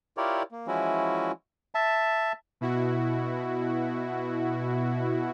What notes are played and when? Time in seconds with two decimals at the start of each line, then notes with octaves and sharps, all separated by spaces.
0.17 E4 F4 G4 A#4 C#5 D5
0.52 A#3
0.67 E3 F3 G#3 C#4 E4 F#4
1.75 E5 A5
2.61 B2 E4 F#4